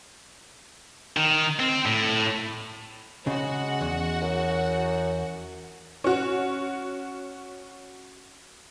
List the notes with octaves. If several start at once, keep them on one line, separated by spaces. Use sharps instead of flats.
D#3
C4
A2
C#3 G#3 F#4 F#5
E2
F#2
C#4 F#4